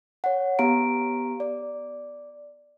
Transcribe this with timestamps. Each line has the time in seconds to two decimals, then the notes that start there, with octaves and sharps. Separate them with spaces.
0.24 C#5 F#5
0.59 B3 G4 F5 A#5 D7
1.40 D5